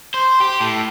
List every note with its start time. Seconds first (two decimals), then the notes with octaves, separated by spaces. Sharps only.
0.14 C5
0.40 G4
0.60 A2